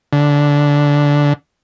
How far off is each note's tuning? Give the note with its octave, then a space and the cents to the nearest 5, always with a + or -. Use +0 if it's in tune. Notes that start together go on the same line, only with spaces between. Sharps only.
D3 -15